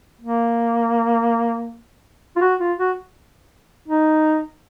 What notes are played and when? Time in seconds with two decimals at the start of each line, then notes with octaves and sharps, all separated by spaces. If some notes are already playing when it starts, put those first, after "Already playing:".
0.22 A#3
2.36 F4
2.42 F#4
2.60 F4
2.78 F#4
3.88 D#4